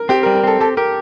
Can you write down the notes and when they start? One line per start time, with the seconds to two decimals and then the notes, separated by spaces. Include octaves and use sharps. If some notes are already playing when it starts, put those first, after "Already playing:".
Already playing: A#4
0.09 C4 G4
0.23 A#4
0.26 G3
0.35 A#4
0.43 C4 A4
0.60 G4 A4
0.77 G4 A#4